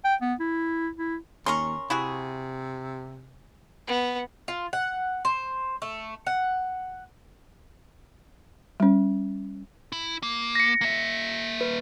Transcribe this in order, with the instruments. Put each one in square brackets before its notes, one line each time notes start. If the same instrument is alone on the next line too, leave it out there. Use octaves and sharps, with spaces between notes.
[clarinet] G5
B3
E4
E4
[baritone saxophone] D#2 [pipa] C#4 A#4 [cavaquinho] C6 C#6
[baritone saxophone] C3 [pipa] E4 F#4 G#4
[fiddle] B3
[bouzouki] F4
F#5
C5
A3
F#5
[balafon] G3 C#4
[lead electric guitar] E4
A#3
[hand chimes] A#6 C#7
[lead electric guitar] A#3 E5
[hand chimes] B4